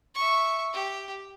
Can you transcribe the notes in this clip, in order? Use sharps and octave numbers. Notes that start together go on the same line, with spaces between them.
E5 C#6
G4